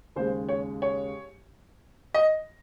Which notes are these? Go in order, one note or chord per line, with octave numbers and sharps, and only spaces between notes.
D#2 C#3 G#3 C5
C#5
C#5
D#5